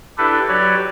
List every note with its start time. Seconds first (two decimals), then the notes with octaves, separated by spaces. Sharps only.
0.18 D4 E4 G4 A4 B4
0.48 F#3 F#4 G4 B4 C#5 D5